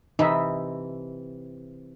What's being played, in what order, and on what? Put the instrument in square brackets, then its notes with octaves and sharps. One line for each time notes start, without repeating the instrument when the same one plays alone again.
[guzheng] C3 E3 C4 [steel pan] D#4 E5